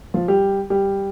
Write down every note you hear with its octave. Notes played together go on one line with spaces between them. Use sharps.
F3 F4
G3 G4
G3 G4